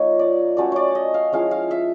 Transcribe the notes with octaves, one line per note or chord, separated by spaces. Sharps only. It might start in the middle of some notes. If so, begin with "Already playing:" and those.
Already playing: F3 A#3 D#4 C#5
D5
F#3 A3 C#4 D5
C#5 D5
D#5
F5
F3 G#3 C#4 E4 F5
F5
E5